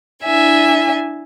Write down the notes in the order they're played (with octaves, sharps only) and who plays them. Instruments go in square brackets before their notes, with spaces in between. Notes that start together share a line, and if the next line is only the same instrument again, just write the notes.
[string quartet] D4 E4 E5 G#5